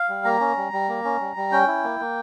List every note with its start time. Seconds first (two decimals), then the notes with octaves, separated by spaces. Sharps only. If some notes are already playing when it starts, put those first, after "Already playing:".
Already playing: F5
0.09 G3
0.25 A#3 A#5
0.41 C#4
0.57 G3
0.73 G3
0.89 A#3
1.05 C#4
1.20 G3
1.36 G3
1.52 C#4 G5
1.67 E4
1.84 A#3
2.00 A#3